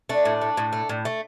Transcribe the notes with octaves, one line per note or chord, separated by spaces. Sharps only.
A3 D4
A2
A3
A2
A3
A2
A3